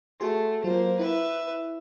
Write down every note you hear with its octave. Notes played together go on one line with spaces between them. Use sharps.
A3 F#4 G#4 C6
F#3 A#3 F4 C5
E4 B4 E5